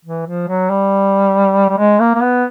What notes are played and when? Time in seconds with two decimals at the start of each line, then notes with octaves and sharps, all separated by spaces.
0.05 E3
0.27 F3
0.48 F#3
0.70 G3
1.69 G3
1.78 G#3
2.00 A#3
2.15 A#3
2.22 B3